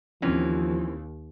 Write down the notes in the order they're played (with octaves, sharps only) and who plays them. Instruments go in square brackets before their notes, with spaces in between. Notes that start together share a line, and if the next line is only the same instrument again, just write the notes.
[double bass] D#2 [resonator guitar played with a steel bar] E3 C4 C#4 [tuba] F3